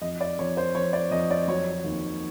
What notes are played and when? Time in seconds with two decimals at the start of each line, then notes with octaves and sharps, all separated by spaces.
0.01 F2 D#5
0.21 D5
0.39 F2 C#5
0.57 C5
0.75 F2 C#5
0.93 D5
1.11 F2 D#5
1.31 D5
1.48 F#3 C#5
1.84 D#2